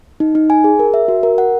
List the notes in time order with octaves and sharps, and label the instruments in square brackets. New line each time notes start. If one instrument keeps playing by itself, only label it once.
[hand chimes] D#4
D#4
G#5
G#4
A#4
E5
F#4
A#4
F#5